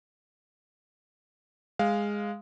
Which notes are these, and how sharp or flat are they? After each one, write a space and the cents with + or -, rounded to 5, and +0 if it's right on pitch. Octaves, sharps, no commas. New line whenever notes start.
G#3 -10 F5 +0